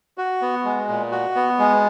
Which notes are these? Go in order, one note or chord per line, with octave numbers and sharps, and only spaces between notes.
F#4
B3
G#3
A#2
F#4
B3
G#3